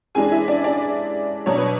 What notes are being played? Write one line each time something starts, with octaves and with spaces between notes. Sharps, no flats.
F#2 E3 G#3 D4 G#4 G#5
E4 E5
D4 D5
D4 D5
B2 F#3 B3 D4 C#5
B4